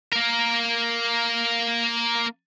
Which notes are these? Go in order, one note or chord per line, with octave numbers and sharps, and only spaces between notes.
A#3 A#4